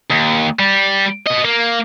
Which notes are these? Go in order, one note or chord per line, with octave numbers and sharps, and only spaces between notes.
D#2
G3
B3 D#5
A#3